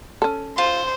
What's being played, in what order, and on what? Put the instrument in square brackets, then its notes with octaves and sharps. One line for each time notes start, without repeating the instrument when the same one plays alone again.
[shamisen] C#4 A4
[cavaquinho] F4 [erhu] C5